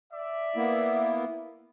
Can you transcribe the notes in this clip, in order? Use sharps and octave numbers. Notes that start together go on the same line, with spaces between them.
D5 E5
A#3 B3 E4